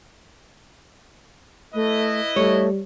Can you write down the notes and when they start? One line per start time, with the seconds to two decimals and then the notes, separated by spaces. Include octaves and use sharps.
1.74 A3 E4 B4 D#5
2.36 G3 A3 C#5